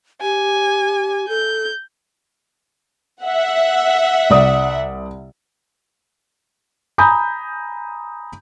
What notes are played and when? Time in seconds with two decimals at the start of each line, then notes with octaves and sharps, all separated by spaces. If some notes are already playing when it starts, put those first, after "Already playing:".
0.21 G4 G#5
1.29 A4 G6
3.23 E5 F#5
4.30 C2 D5 D#6
6.98 G#5 A#5 B5 D#6 G6